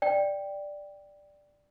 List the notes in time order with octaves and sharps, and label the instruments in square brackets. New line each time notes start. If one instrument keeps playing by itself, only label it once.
[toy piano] D5 G5